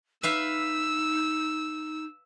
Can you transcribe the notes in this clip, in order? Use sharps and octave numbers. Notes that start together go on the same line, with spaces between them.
D#4 B4 E5 F5 E6